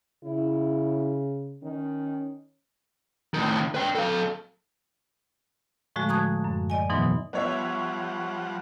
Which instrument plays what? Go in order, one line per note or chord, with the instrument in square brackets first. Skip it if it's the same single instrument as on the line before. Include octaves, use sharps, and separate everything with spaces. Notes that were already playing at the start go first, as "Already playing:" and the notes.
[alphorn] C#3 [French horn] E4
[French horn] D#3 [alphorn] C#4
[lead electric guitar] A2 D#3
B4 G5
A4 F5
[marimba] A2 D3 F3 G#3 A3 F#4
A5 A#5 C#6 D#6 F#6 G#6
F#2
D5 D#5 G#5
G#2 B2 E3 F#3 B3 D#4
[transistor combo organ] F3 G3 F#5 [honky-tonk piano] B3 C#5 E5